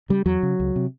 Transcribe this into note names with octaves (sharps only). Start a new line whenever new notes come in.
C#3 G3
E2 F#3
C#3
C#2
C3